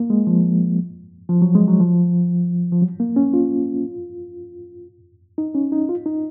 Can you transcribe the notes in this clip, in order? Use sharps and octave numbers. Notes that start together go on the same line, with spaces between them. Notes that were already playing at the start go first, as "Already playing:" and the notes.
Already playing: A#3
G#3
F3
F3
F#3
G#3
F#3
F3
F3
F#3
A#3
C#4
F4
D#4
C#4
D#4
F4
D#4